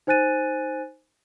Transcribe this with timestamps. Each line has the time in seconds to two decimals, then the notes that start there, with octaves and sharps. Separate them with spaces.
0.07 D#4 C5 G#5 F#6 A6 D#7